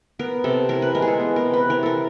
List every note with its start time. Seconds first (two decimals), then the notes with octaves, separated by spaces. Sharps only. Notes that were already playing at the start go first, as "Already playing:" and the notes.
0.19 B3 A#4
0.44 C3 A4
0.69 E3 A#4
0.82 B4
0.95 G#3 A#4
1.02 G#4
1.08 A4
1.20 B3
1.36 A#4
1.45 C3
1.54 B4
1.69 E3 A#4
1.83 A4 A#4